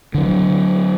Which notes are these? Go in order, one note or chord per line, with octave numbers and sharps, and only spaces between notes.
D3 F#3